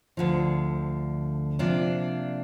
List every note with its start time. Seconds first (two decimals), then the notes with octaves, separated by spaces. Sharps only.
0.17 D2 D3 F3
1.59 C3 F3 A#3 D4